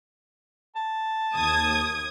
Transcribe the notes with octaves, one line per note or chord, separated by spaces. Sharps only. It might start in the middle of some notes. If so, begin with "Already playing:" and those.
A5
D#2 D#6 G#6